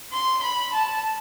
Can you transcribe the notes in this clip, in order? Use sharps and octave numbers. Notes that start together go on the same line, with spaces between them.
C6
B5
A5